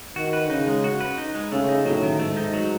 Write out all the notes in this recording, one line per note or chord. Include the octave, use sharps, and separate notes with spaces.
D#3 F#4
B4
C#3 D#4
G#3
F#4
B4
D#4
G#3
C#3 A3
D#4
A2 F#3
D#3
G#2 A3
D#4
F#3